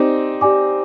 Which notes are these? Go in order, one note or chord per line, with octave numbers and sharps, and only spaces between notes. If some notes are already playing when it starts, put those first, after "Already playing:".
Already playing: C4 D#4 G4 D5 G#5 D6
G4 D5 G#5 D6